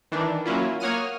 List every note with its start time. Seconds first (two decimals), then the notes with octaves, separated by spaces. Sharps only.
0.12 D#3 E3 D4
0.46 F#3 A#3 C#4 E4 F4
0.80 A#3 C#5 F#5 D#6 F6 D#7